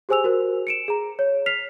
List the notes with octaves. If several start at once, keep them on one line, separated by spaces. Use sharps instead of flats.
G4 G#4 C5 G#5 E6 F7
F#4 A#4 C5
C#7 D7 E7
G#4 A#5
C#5
F6 B6 C7 F7